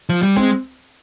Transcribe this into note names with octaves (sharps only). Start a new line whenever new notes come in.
F3
G3
G#3 C4